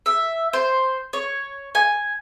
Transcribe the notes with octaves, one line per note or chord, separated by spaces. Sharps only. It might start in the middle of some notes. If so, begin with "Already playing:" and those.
E5
C5
C#5
G#5